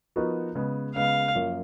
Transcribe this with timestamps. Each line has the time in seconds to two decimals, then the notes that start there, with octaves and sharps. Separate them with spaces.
0.16 F3 B3 D#4 F#4 A#4
0.55 C#3 G#3 B3
0.95 C#3 G#3 B3 F5
1.35 F#2 F3 A#3 C#4 F4